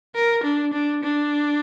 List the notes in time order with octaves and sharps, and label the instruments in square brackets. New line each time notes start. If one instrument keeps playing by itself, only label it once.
[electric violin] A#4
D4
D4
D4